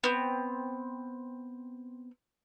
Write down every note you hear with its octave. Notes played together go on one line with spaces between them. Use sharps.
B3 C4